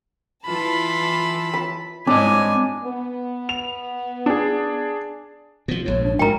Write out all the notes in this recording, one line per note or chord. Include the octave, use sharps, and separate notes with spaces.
E3 F4 A5 B5
B5
G#2 C4 D4 C#5 D#5 G#5
B3
F7
D4 G#4
B2 F3
A#1 G#2 C#5
D4
G#2 F#3 A#4 G5 A#5